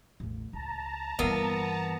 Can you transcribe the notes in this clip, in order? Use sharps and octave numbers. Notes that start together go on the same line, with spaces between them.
A1 E2
C#2 A5 A#5
G2 E3 A#3 B3 E5 F5